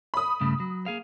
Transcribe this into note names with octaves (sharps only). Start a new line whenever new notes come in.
B5 D#6
G2 C#3 A3
F#3
A#3 G#4 F5